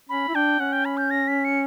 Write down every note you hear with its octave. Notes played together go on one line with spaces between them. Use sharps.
C#4 B5
E4
D4 G5
C#4 F#5
G5
B5
G6
A#6
B6
C#7